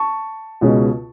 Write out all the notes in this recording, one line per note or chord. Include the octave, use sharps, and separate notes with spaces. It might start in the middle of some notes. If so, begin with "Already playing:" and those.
Already playing: A5 C#6
C#2 B2 G#3 C#4